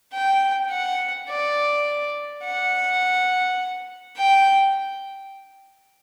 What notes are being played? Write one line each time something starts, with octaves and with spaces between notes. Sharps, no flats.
G5
F#5
D5
F#5
G5